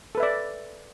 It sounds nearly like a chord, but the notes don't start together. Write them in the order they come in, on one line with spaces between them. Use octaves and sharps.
A4 B4 E5 D5